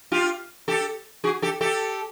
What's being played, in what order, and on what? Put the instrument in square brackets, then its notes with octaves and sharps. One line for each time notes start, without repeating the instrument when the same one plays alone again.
[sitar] F4 G4
G4 A4
F#4 G#4
G4 A4
G4 A4